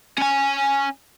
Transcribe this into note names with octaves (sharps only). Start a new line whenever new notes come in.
C#4 G#5